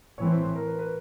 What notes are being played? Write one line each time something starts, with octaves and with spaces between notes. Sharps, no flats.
A2 E3 A3 C4 C#5
C5
A#4
B4
B4